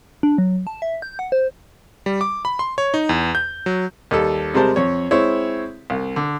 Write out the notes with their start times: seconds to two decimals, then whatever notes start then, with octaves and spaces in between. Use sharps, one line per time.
0.23 D4
0.38 F#3
0.67 A5
0.82 E5
1.02 G6
1.19 F#5
1.32 C5
2.06 G3
2.21 D6
2.45 B5
2.59 C6
2.78 C#5
2.94 D#4
3.09 E2
3.35 G6
3.66 F#3
4.11 D#2 G3 A4
4.54 C3 G3 G#3 A#4 C5 A5
4.76 F2 C#5
5.11 G#3 C4 E4 C#5
5.90 C2
6.16 D3